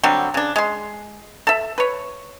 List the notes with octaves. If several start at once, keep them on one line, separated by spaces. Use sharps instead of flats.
D3 F#3 G3 C4
C#3 D4
G#3 C6
A4 E5
B4 C#5